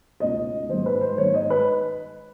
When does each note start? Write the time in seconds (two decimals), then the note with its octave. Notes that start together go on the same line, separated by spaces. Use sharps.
0.20 C#2 B2 D#5
0.69 G#2 D#3 C5
0.86 B4
1.01 C5
1.17 G#2 D#3 C#5
1.34 D#5
1.50 B4